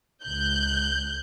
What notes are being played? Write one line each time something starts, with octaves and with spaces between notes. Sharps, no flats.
C#2 F#6 G6